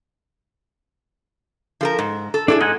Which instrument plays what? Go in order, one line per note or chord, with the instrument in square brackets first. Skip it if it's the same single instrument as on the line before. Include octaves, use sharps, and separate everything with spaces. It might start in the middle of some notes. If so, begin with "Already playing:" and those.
[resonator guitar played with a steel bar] F3 A4 A#4
G#2
A4
[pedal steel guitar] D4 E4 [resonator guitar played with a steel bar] G#4 A4 D5
[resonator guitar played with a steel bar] G#2 [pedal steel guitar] D#5 F#5 G#5